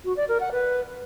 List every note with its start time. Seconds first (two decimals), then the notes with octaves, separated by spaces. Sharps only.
0.05 F#4
0.17 D5
0.28 A#4
0.40 F#5
0.52 B4